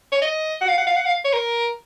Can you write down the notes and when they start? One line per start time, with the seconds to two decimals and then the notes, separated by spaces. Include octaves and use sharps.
0.12 C#5
0.22 D#5
0.61 F#5
0.68 F5
0.78 F#5
0.87 F5
0.96 F#5
1.06 F5
1.25 C#5
1.33 A#4